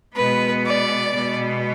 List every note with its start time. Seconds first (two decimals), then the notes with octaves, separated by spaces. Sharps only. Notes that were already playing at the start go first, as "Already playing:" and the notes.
0.16 B2 G#3 B3 B4
0.65 D5
1.14 B2 G#3 B3